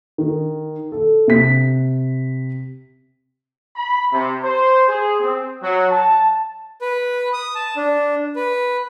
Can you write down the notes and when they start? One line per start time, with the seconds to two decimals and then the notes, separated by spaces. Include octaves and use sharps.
0.18 D#3
0.92 A4
1.28 C3 B6
3.76 B5
4.12 C3
4.42 C5
4.87 G#4
5.20 C4
5.62 F#3
5.91 A5
6.82 B4
7.33 D#6
7.55 A5
7.76 D4
8.36 B4